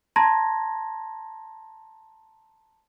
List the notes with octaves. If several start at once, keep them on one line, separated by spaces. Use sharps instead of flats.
A5 A#5 C6 G#6 A#6